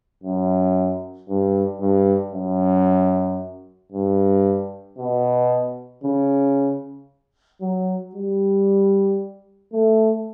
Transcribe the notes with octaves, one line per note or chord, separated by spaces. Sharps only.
F#2
G2
G2
F#2
G2
B2
C#3
F#3
G3
A3